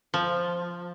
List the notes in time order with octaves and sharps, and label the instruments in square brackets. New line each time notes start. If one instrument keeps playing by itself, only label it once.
[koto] F3